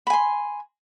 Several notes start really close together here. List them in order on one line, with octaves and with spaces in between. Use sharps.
B5 G#5 C6